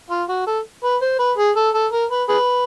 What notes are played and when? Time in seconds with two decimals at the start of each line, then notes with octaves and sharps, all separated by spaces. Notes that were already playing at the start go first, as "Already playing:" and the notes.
0.10 F4
0.29 F#4
0.47 A4
0.84 B4
1.02 C5
1.19 B4
1.38 G#4
1.56 A4
1.74 A4
1.92 A#4
2.11 B4
2.28 G#4 B4